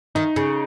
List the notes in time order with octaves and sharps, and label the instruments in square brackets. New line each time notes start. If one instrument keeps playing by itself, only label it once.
[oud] D#3 [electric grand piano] D#4
[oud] C#3